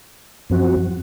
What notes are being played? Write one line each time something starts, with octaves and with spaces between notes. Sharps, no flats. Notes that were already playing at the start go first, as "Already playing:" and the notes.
F#2 F3 C4 F#4